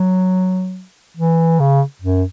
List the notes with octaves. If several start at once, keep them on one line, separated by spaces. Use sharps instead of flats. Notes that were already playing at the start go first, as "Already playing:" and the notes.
Already playing: F#3
E3
C#3
F#2